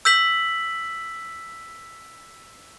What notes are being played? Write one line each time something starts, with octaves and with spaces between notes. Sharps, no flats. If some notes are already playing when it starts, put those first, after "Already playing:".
E6 G6 B6 F#7